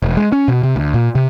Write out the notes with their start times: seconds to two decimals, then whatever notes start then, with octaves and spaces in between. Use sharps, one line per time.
0.02 E1
0.17 G#3
0.32 C#4
0.48 B2
0.63 C3
0.76 D2
0.94 A#2
1.15 C3